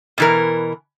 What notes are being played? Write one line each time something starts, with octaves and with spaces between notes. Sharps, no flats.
B2 E3 A#4